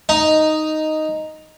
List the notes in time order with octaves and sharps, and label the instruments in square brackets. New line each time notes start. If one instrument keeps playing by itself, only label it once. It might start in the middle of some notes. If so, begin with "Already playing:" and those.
[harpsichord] D#4